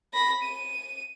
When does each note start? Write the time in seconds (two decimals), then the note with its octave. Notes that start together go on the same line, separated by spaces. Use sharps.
0.14 B5 A#6
0.42 D#7